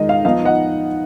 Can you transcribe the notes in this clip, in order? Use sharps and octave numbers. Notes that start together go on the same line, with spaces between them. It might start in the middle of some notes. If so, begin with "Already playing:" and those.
Already playing: D#3 G#3 D#4 D#5
F5
F3 B3 D#4 F5
D#5 F#5